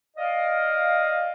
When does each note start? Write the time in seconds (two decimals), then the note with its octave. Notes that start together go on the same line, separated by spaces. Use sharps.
0.17 D5 D#5 F5